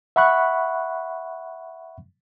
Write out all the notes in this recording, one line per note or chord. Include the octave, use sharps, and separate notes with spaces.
E5 F#5 B5 C#6 F#6